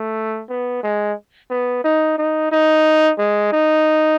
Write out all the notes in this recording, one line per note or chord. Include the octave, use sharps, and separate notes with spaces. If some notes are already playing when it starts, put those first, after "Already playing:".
Already playing: A3
B3
G#3
B3
D#4
D#4
D#4
G#3
D#4